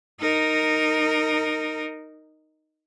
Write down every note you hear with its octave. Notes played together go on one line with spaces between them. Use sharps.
D#4 A#4